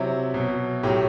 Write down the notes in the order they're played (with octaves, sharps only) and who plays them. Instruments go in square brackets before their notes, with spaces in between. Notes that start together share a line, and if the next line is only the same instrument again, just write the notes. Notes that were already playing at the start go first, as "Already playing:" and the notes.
Already playing: [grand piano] C3 F#3 E4
B2 F#3
A2 F#3 G4